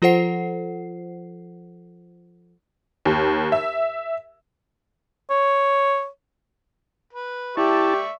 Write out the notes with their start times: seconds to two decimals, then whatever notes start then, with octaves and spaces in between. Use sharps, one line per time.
0.02 F3 F4 A4 C5 F#5 C7
3.05 D#2
3.52 E5
5.30 C#5
7.13 B4
7.57 E4 G4 D5 E5 A5 C#6